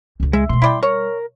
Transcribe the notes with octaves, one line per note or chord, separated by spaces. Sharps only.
C#2 C#3
G#3 E5
B2 G#3 C6
G3 E4 D5 G5
A#4 C#5